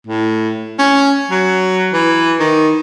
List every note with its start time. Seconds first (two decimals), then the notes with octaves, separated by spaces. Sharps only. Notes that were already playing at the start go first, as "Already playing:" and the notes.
0.07 A2
0.79 C#4
1.31 F#3
1.93 E3
2.40 D#3